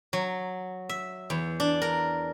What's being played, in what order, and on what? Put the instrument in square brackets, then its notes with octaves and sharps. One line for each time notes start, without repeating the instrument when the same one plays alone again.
[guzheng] F#3
E5
E2
D4
A#4